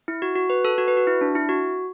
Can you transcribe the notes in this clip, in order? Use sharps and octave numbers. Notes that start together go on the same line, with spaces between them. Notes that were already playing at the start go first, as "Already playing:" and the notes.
E4
F#4
F#4
B4
A4
F#4
B4
F#4
E4
D4
E4
F#4